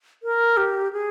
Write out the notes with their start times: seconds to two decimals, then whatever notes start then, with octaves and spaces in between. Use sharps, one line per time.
0.23 A#4
0.57 G4
0.93 G#4